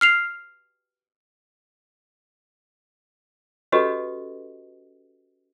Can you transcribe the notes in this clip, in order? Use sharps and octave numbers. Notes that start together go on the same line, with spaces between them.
F6 C7 F7
C#4 F#4 G4 A4 B4 D#5